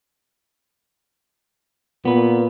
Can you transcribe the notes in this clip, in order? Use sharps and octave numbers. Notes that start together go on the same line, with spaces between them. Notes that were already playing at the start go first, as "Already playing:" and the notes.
A#2 B3 B4